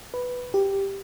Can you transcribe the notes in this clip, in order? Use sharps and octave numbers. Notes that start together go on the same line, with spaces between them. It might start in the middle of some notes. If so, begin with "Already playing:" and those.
B4
G4